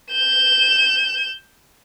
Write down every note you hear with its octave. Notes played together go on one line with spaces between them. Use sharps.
G6 E7